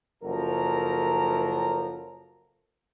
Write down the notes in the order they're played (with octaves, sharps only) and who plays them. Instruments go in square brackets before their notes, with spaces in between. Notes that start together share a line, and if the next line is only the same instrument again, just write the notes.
[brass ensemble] F#1 F3 F#3 A4 A#4 A#5